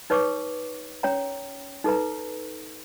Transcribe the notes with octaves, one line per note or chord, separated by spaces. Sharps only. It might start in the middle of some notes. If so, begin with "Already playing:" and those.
D#4 B4 C#5 C#6 D6
C#4 C#5 G5 A#5
D#4 A4 B4 A#5